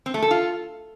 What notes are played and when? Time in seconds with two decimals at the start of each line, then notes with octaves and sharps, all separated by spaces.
0.06 C4
0.14 A3
0.22 A4
0.31 F4